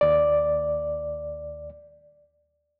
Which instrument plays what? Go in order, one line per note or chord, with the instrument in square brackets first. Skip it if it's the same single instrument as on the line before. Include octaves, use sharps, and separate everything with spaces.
[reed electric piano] D#2 D5